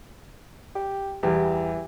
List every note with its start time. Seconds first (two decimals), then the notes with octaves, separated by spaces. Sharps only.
0.76 G4
1.23 E2 E3 G3 G4